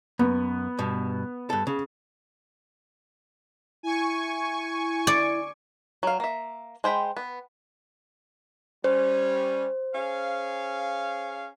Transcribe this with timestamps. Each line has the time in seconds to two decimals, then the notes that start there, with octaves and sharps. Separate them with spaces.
0.19 F#2 B3
0.79 G2 B2
1.50 G2 A4
1.67 C#3
3.83 E4 G#5 C#6
5.07 D5
6.03 F#3 F5
6.20 A#3 E5
6.84 G#3 C5 G5 B5
7.17 B3
8.84 G3 C#4 C5
9.95 C#4 G#4 F5